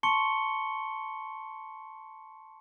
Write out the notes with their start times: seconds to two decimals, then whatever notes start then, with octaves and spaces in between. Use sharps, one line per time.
0.03 A5 C6 C#6 C#7 G7